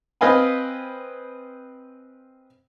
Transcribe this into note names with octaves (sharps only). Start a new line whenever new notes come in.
C4 B4 D#5 F5 G#5 B5